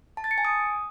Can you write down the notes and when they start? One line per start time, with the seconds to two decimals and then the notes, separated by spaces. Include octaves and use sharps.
0.17 A5
0.24 A6
0.31 C#7
0.38 G#5
0.45 D#6